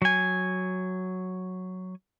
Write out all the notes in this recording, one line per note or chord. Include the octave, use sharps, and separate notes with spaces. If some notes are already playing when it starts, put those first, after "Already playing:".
F#3 G#5